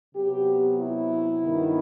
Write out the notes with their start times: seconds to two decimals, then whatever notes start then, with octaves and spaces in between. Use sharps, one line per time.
0.13 C3 F#3 B3 G4
0.77 E4
1.41 G2 D#3 F#3 B3